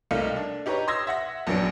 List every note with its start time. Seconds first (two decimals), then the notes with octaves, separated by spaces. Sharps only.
0.11 C2 A3 A#3 D#4 F5 C#7
0.36 D4
0.66 D#4 G4 B4 C#5 A#5
0.88 C6 D#6 E6 G#6 A#6
1.07 E5 F#5 A#6
1.47 A#1 F#2 F#3 B3 D4 D7